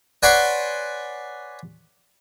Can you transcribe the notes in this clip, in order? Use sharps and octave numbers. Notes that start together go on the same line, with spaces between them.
B4 C#5 D5 F#5 G#5 C6